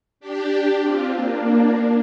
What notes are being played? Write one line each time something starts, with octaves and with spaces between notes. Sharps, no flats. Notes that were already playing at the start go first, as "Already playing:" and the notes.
D4 G4
C4 F4
A#3 D4